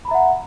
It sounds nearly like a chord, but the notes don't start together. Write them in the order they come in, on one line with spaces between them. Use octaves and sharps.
B5 A#5 E5 F#5